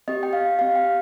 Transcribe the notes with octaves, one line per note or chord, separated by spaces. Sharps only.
C4 G4 D#5
G5
F5
C4 G4 F5
G5